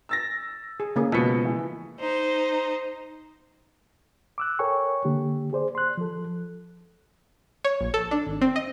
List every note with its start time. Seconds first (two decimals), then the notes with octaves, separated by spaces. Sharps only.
0.09 E6 A6 A#6
0.80 G#4
0.96 C#3 A#3 G#4
1.12 B2 F3 G#3 B6 C#7
1.45 E3
1.99 D#4 C5
4.38 D6 E6 F#6
4.59 A4 A#4 C#5 G5 G#5 C#6
5.05 D3 A#3 G4
5.53 G#4 C5 D5
5.75 C6 F#6
5.97 F3 A4
7.64 C#5
7.81 A#1
7.94 A4
8.11 D4
8.27 G#1
8.41 C4
8.56 D#5